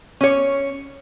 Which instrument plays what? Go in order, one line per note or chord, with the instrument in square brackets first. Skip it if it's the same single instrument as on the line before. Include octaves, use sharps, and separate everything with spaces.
[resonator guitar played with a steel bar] C#4 C#5